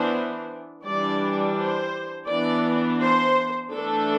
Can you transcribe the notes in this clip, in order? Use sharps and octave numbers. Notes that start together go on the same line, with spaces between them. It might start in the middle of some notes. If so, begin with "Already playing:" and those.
Already playing: E3 B3 D4 C5
E3 G3 D4 D5
C5
E3 B3 D4 D5
C5
E3 A3 D4 A4